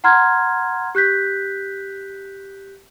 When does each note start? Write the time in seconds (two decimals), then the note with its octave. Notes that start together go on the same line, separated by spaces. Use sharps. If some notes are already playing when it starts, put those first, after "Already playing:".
0.04 F#5 A#5 C6 F6 G#6
0.95 G4 F#6 G6 B6